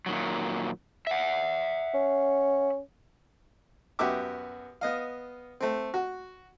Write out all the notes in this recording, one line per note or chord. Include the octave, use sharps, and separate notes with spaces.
A#2 D#3 F#3
E5 F#5
C#4
F#2 B3 F#4 G4 E5 D6
B3 D#5 F5
A3 C4
F#4